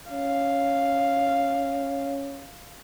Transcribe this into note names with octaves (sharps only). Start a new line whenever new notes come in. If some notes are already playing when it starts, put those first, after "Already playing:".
C#4 F5